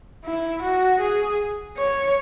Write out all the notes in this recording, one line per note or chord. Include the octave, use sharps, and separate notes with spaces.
E4
F#4
G#4
C#5